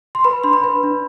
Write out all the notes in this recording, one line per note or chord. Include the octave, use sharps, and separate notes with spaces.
C6
B4 B5
D4 C6
B5
B4
D4